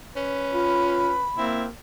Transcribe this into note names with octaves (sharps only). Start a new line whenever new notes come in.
C#4 B4
F4 B5
A#3 C4 E4